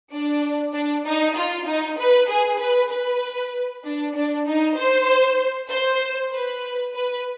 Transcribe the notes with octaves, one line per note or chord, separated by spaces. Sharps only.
D4
D4
D#4
F4
D#4
B4
G#4
B4
B4
D4
D4
D#4
C5
C5
B4
B4